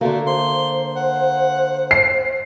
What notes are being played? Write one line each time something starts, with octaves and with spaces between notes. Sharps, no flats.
D3 A3 A#3 F#4
C5 C6
F#5
C7